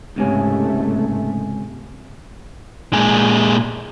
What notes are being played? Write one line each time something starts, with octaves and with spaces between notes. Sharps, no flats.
C#2 G#2 C3 A3 C#4
A#2 G#3